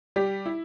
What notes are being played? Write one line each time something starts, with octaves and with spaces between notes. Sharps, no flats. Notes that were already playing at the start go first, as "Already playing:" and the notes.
G3 G4
E4